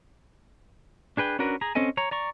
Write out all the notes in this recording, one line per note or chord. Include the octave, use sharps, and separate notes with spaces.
D4 G#4 B4 G5
C#4 D4 F#4 A#4 B4
G#4 A#5
C4 C#4 A4 D#5 G#5
C#5 A#5
D5 A#5 C#6